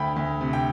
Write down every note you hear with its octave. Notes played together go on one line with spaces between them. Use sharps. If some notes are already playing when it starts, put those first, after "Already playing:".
Already playing: D2 G5 B5
D2
C3
G5